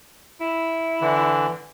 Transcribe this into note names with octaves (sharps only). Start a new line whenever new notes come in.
E4
D3 E3